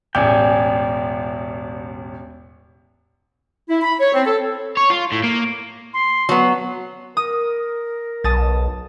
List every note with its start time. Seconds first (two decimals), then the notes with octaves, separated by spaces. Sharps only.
0.15 E1 A1 D5 G5 G#5 D6
3.70 E4
3.83 B5
4.00 C#5
4.14 C4
4.26 A4
4.77 C#5
4.90 F4
5.12 A2
5.24 A#3
5.94 C6
6.29 F#3 B3
7.17 A#4 D#6
8.24 B1 A5 D#6 A6